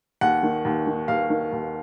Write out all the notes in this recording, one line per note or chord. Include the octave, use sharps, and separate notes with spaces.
D#2 F#5
D#3
D#2
D#3
D#2 F5
D#3
D#2